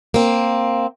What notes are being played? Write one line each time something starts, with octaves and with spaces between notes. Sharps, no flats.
A#3 C4